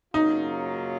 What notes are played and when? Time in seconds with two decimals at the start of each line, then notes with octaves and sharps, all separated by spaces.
0.14 F#2 C#3 F#3 A#3 D#4 F4